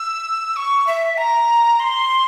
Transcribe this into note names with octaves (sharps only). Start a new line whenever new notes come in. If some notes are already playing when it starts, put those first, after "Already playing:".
Already playing: E6
C#6
E5
A#5
C6